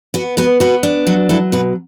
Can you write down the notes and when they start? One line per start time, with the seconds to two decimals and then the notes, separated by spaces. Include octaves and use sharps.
0.14 B3 F#4
0.37 B3 F#4 B4
0.60 B3 F#4 B4
0.83 D4
1.07 F#3 F#4
1.29 F#3 E4 A4
1.52 B2 F#4 B4